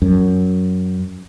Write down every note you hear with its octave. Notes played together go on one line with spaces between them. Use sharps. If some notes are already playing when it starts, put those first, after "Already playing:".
F#2